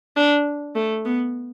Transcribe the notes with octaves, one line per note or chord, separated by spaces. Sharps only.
D4
A3
B3